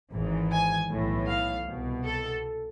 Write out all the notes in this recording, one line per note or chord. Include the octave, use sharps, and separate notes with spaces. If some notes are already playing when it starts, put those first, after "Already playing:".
G#1 G#2 E3
G#5
B1 A2 E3
F5
C2 B2
A4